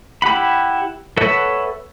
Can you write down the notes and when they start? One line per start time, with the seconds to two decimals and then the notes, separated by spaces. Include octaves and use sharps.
0.22 E4 G4 F#5 B5
1.17 A4 B4 C#5 E5 F#5